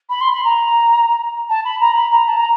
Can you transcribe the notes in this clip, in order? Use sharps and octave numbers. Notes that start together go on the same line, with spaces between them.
B5
C6
B5
A#5
A5
B5
A#5
B5
A#5
A5
A#5